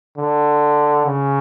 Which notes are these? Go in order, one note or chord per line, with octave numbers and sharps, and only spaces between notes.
D3
C#3